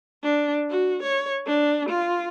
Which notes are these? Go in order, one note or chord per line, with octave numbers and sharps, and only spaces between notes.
D4
F#4
C#5
D4
F4